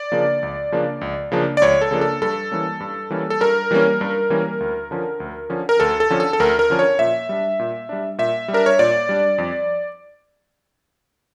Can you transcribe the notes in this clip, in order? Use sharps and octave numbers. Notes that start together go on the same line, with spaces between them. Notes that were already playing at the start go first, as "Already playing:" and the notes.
Already playing: D5
C#3 F3 A#3 D4
C#2
C#3 F3 A#3 D4
C#2
C#3 F3 A#3 D4
D5
C#2 C#5
A4
C#3 F3 A#3 D4
A4
G2 A4
E3 G3 A#3 C#4
G2
E3 G3 A#3 C#4
A4
G2 A#4
E3 G3 A#3 C#4
G2
E3 G3 A#3 C#4
D2
D3 F3 C#4
D2
D3 F3 C#4
A#4
D2 A4
A4
D3 F3 C#4
A4
A4
D2 A#4
A#4
D3 F3 C#4
C#5
A#2 E5
G3 D4
A#2
G3 D4
A#2 E5
G3
D4 A#4
C#5
A#2 D5
G3 D4
F2